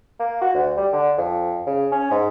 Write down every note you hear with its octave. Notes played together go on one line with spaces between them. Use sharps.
A#3
F#4
D2
G3
D3
F2
C#3
C#4
G#2